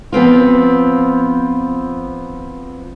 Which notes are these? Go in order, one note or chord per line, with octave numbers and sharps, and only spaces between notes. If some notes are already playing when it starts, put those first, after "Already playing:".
F3 B3 C4 F4